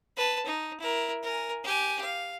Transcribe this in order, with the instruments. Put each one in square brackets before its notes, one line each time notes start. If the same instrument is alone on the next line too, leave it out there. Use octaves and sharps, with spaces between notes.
[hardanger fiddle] B4 A5
D#4
E4 A#4
A#4 G#5
G4 G#5
F5